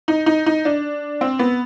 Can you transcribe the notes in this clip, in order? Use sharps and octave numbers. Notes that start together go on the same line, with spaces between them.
D#4
D#4
D#4
D4
C4
B3